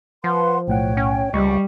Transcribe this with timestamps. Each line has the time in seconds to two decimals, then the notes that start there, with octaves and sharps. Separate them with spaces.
0.24 F3 B4 F#5 C6
0.68 B1 A2 C#5 F#5 G5
0.97 C#4
1.34 C#2 G3 D#5 C#6